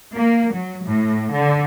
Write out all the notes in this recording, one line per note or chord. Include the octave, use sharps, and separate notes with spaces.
A#3
F#3
A2
D3